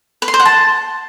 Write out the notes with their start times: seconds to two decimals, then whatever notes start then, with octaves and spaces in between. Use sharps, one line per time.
0.22 B4
0.28 C6
0.34 C5
0.40 F#5
0.45 A5